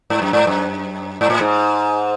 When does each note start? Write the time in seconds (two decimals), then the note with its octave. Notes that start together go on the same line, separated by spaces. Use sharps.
0.10 G#2
0.22 F#2
0.33 G#2
0.47 F#2
1.21 G#2
1.30 A2
1.40 G#2